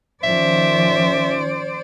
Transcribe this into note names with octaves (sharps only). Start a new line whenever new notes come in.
D#3 F3 C#4 C5 D5 E5